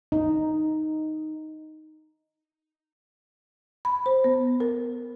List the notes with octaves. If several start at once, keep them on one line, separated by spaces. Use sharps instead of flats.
D#4
B5
C5
B3
A#4